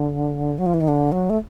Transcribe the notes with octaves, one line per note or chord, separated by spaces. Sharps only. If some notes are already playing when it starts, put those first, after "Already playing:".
Already playing: D3
F#3
F3
E3
D#3
D3
F#3
A3